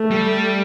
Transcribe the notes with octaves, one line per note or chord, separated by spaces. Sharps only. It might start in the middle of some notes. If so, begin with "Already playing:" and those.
Already playing: A3
G3